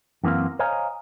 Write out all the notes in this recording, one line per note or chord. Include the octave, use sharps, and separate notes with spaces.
F#2 E3 A#3 C4 F5
C5 C#5 D#5 F5 G#5 A#5